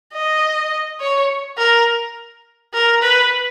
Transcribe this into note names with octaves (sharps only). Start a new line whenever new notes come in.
D#5
C#5
A#4
A#4
B4